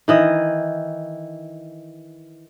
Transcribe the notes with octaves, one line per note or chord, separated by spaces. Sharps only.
D#3 E3 D#5